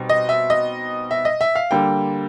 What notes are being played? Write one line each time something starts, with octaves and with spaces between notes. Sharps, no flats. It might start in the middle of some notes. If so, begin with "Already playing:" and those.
Already playing: B2 G3 C4 D#4
D#5
E5
D#5
E5
D#5
E5
F5
D3 G3 A#3 G5